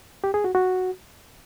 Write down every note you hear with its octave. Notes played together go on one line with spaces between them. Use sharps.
G4
G#4
F#4
F#4